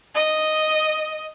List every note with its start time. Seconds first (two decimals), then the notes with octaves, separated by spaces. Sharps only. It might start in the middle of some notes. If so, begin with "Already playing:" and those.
0.15 D#5